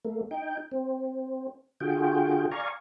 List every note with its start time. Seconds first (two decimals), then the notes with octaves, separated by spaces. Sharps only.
0.05 A3 A#3
0.31 D#4 G5
0.72 C4
1.80 D3 F4 F#4 G#4 G5
2.51 D5 F5 G#5 A#5 C#6